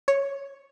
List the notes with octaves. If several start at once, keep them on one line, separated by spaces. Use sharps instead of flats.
C#5